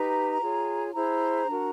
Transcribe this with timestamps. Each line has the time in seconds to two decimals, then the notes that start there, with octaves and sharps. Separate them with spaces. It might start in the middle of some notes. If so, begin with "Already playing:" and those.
Already playing: D#4 G4 B4 A#5
0.42 F4 G#4 C#5
0.94 E4 G#4 C5 A#5
1.47 D4 F#4 A#4